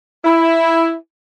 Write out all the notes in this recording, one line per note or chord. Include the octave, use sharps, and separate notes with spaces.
E4